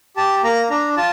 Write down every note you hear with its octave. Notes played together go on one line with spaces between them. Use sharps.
G4 A5
A#3 A#5
D4 A#5
F4 A5